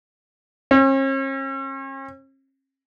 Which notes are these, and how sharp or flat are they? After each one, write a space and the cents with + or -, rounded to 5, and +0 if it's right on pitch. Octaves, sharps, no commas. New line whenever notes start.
C#4 -45